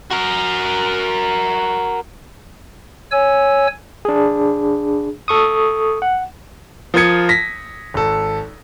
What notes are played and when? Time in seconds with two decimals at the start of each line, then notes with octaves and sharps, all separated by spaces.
0.11 F#4 A#4
3.12 C#5 G#5 E6
4.05 D4 G#4
5.28 A4 C#6 D#6
6.02 F#5
6.94 F3 F4 A#4 D#6 G#6 C#7
7.29 A#6 B6
7.94 G#1 A4